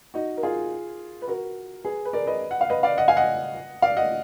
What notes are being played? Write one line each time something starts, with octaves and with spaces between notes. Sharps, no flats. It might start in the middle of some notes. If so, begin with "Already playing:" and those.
D#4 F#4
A#4
F4 G#4
B4
F#4 A#4
G#4 B4
B4
A#4 D5
B4 D#5
F#5
F5
B4 D#5
D5 F5
D#5 F#5
F5 G#5
D#5 F#5
D5 F5
D#5 F#5